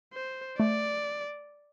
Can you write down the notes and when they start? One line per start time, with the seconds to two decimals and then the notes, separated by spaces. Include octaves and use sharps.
0.13 C5
0.59 A3 D5